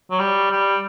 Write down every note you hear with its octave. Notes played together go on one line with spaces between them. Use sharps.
F#3
G3
G3